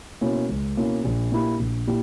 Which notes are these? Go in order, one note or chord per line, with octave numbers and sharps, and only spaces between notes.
B2 A#3 C#4 E4
C#2
B2 A#3 C#4 E4
A#1
A#2 A#3 E4 G4
A#1
A#2 E4 G4